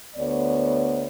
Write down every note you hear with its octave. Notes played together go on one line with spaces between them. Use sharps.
D2 B3 C#5 D5